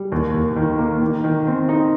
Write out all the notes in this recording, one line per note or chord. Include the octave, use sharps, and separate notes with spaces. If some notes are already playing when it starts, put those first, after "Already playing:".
Already playing: G3
D#2
D#2
D#3
A#3
D#3
D#3
C4
D#4